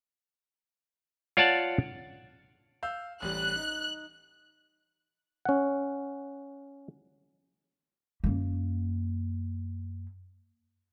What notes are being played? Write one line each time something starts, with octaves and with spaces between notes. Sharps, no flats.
F4 C#5 D5 F#5 A5
F5 E6 G6
A1 G3 F#6
D#4
C#4 F#5
F#2 A#3